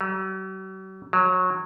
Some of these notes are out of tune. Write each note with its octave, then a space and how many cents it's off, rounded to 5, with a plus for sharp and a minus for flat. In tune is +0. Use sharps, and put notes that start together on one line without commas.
F#3 +45
F#3 -20